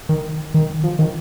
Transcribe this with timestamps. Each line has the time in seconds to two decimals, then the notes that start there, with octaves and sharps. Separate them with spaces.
0.09 D#3
0.54 D#3
0.84 F3
0.99 D#3